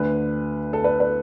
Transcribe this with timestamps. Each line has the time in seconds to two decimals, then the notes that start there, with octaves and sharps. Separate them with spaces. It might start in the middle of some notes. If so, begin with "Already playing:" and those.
Already playing: D2 D3 B4
0.73 A4
0.84 B4
1.00 B4